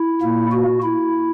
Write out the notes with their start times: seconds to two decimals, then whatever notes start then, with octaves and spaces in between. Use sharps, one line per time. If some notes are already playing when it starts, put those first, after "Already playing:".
Already playing: E4
0.22 A#2 A#3
0.52 F#4
0.83 E4